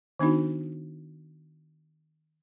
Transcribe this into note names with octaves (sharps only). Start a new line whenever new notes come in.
D#3 B3 D4 D#4 F#4